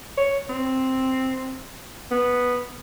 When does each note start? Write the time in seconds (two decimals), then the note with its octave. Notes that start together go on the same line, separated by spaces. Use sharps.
0.18 C#5
0.49 C4
2.11 B3